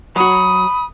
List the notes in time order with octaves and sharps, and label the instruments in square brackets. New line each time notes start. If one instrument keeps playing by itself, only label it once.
[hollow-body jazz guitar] F#3 F#4 [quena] B5 [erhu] D#6